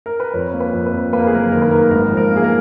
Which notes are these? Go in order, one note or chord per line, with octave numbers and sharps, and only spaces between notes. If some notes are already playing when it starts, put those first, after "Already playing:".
A#4
B4
F2 C#5
A#3
B4
F2
B4
F2
A#3 B4
A#4
G#4
F#1 A#4
D#3 A#4
B4
A#3 A#4
G#1 A#4
F3
A#4
A#3
G#4
A#4